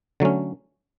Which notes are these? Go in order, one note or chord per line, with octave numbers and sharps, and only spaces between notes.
D3 F#3 A3 C#4